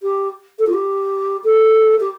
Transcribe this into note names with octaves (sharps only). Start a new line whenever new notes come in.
G4
A4
F4
G4
A4
G4